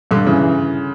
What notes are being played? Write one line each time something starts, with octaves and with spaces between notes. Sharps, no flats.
G2 D3
C#3 E3